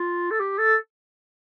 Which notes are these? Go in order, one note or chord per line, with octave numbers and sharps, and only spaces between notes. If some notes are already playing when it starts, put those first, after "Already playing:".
Already playing: F4
A4
G4
A4